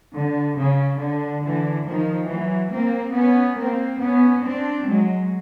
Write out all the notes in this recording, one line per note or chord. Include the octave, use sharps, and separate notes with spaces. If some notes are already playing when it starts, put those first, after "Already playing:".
D3
C#3
D3
D3 E3
D#3 F3
E3 F#3
A#3 C4
B3 C#4
A#3 C4
B3 C#4
C4 D4
F#3 G#3